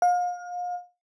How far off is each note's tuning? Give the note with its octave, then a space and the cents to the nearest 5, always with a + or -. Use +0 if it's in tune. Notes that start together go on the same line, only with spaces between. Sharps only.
F5 +35